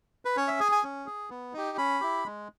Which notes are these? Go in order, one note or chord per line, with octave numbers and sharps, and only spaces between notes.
B4
C#4 C#5
E5
G#4 G#5
G#5
C#4
G#4
B3
D#4 G4
C#4 B5
E4 G4
G#3